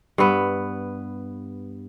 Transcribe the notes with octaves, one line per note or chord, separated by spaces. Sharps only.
G2 B3